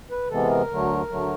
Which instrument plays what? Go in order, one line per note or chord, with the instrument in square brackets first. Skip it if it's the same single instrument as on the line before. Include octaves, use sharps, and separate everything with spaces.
[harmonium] B4
C3 E3 G#3 B3 A4
A#4
D2 D3 F#3 A3
D2 D3 F#3 A3